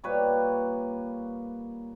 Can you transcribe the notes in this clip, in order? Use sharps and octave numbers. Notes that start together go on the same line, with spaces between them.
A#2 G3 A#3 B4 C#5